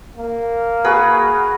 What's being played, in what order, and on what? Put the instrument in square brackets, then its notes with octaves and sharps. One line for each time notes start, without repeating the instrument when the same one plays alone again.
[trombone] A#3
[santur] F#4 G#4 A#4 [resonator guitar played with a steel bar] B4